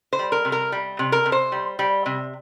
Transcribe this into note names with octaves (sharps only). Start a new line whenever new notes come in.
C5
G3
A#4
C3
A#4
G3
C3
A#4
C3
C5
G3
G3
C3